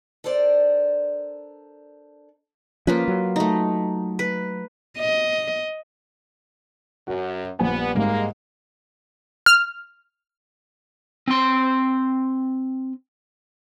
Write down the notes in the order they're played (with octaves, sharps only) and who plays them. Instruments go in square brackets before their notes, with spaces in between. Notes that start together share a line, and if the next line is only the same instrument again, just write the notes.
[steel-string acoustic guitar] D4 A4 A#4 C5 D5
[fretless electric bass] F3 C#4 [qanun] A#3 F4 B4
[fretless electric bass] F#3
[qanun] A3 D#4
B4
[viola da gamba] D#5
[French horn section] F#2 [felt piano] F#4
[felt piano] A#1 G#5 [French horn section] G3 B3
[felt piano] G#2 G3 [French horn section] G#3 A#3
[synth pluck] F6
[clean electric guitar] C4 C6